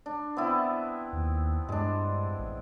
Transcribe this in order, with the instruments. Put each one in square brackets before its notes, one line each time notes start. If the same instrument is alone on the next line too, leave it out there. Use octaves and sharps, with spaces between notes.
[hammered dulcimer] D4
B3 C4 E4
[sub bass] D#2
[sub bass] G2 [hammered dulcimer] G#3 D4
[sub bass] A1